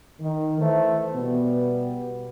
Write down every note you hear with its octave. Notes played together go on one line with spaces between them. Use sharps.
D#3
E3 A3 B4 C5 E5
B2 G3 B3